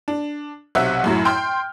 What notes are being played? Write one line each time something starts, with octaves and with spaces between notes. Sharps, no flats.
D4
B1 C3 E5 F#5
F#2 A2 F#3
G5 C6 F6 G6